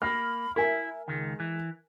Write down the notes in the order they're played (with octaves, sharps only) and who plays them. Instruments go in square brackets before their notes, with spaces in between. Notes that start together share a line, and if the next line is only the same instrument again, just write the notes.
[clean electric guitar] A#3 [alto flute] B5 [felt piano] F6
[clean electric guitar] E4 [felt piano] A#4 G#5 [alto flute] E5
[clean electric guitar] C#2 D#3 [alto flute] G#3
[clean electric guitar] E3